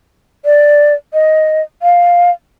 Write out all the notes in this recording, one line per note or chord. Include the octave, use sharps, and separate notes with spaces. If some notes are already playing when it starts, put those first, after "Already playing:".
D5
D#5
F5